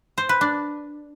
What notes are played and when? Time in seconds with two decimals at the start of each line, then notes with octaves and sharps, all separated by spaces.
0.18 C5
0.29 B4
0.41 D4